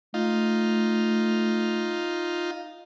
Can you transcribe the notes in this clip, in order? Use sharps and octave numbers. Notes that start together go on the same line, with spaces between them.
A3 D#4 F4